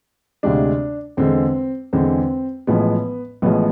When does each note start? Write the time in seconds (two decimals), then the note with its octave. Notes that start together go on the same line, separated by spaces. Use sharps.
0.43 D2 C3 G#3 D4
1.17 E2 D3 G#3 C4
1.93 E2 D3 G#3 C4
2.67 A1 A2 F3 G#3 B3
3.42 A1 A2 F3 G#3 B3